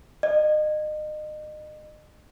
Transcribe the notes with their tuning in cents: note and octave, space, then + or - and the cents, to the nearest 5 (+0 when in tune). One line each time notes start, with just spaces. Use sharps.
D#5 -30